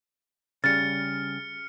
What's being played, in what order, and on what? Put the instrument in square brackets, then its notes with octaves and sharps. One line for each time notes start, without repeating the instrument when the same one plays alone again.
[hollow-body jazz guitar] C#3 G3 [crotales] F6 C#7 [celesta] A6